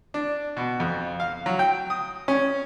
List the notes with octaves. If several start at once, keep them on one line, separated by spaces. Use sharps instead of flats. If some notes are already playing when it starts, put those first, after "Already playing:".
D4
B2
F2
F5
F#3
G5
D#6
C#4